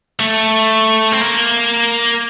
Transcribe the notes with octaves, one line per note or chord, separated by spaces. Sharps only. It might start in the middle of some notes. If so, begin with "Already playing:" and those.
A3
C4
A#3